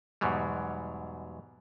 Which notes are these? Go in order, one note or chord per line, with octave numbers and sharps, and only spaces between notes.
E2 G#2 B2 F#3 G3